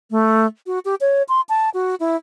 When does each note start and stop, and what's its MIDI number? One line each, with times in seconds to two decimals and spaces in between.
0.11 0.46 57
0.67 0.79 66
0.85 0.95 67
1.01 1.23 73
1.29 1.41 84
1.49 1.70 81
1.74 1.95 66
2.00 2.16 64